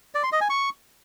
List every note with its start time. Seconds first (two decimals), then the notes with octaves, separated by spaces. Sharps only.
0.15 D5
0.23 C6
0.32 D#5
0.41 G#5
0.50 C#6